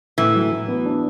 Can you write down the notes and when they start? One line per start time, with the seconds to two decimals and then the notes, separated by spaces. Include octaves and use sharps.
0.18 A2 E3
0.36 F#3
0.52 A2
0.68 B3
0.86 D4